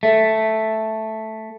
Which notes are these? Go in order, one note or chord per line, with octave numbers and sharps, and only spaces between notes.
A3